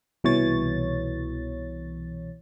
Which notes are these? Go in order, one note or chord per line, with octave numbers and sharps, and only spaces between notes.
C2 B2 E3 C#5 A6